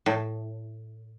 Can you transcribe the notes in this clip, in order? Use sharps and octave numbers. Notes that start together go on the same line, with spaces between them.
A2